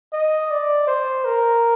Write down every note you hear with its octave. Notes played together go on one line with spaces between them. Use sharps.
D#5
D5
C5
A#4